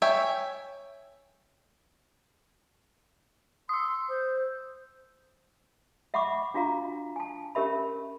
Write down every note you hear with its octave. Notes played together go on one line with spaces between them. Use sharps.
C#5 E5 G5 G#5
C6 D#6 E6
C5
E5 F#5 B5 C#6 D6
D4 F4 F#4 F5 A#5
G#5 A5
C#4 G4 A#4 E5 B5